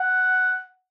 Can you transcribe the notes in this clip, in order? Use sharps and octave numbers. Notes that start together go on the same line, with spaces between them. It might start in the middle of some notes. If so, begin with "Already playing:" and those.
Already playing: F#5